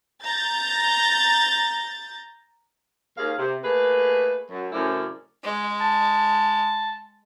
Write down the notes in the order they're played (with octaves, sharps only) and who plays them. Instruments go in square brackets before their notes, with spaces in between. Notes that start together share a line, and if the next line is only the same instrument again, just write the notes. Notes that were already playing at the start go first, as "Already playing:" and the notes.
[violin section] A#5 G6 A6
[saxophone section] D#2 G#4 F5
C3
A3 A#3 G#4 B4
F#2
F#2 A2 C#3 C4 E4 D5
[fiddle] G#3
[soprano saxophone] A5